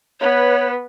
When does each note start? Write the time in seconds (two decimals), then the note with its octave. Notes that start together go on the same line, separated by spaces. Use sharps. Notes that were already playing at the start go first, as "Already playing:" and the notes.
0.21 B3 B4 C#5